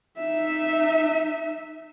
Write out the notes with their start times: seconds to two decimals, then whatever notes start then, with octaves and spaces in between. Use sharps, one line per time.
0.18 D#4 E5